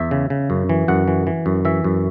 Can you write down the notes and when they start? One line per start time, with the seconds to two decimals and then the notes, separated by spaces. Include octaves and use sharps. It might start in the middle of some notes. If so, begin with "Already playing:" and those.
Already playing: E2 E5
0.11 C#3
0.30 C#3
0.50 F#2
0.69 E3
0.88 F#2 F#5
1.08 E3
1.27 E3
1.46 F#2
1.65 E3 E5
1.84 F#2